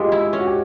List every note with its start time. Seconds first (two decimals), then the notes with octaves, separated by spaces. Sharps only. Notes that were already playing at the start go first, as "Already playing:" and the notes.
Already playing: G#3 F4 G4
0.12 E4
0.33 C#4
0.39 F#4
0.46 G4